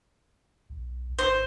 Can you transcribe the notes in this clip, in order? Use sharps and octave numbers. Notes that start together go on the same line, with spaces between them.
B1
G#1 C5